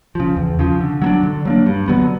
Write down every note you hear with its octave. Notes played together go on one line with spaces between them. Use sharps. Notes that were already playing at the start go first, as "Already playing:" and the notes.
C#3 F3
E2
C#3 F3
D3
F#3 A#3 D4
D3
F#3 A#3 D4
G2
D3 F#3 B3